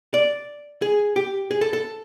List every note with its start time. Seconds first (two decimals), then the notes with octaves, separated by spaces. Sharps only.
0.14 D5
0.82 G#4
1.16 G4
1.51 G#4
1.61 A4
1.73 A4